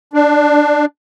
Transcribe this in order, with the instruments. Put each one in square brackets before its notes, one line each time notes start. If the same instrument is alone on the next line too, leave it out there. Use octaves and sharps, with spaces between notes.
[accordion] D4